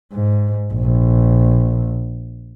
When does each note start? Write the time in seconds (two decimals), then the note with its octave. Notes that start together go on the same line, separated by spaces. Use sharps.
0.13 G#2
0.73 A#1